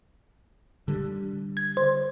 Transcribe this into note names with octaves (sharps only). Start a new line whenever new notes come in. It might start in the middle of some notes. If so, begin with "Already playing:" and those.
D3 G3
G#6
C5